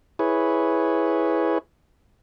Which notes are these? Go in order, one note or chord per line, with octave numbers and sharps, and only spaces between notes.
E4 G#4 B4 C#5